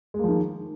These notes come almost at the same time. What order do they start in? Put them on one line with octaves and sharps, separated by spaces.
G#3 A#3 F3 D#3